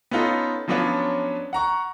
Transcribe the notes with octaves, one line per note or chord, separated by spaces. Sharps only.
B3 C#4 D#4 F4 A4
F3 F#3 B3 C#4 D4 F4
F#5 A#5 C#6